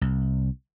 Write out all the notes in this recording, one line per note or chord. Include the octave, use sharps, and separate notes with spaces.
C2